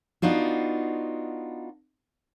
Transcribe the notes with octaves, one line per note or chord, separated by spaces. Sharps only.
B3 D4 D#4 F4 F#4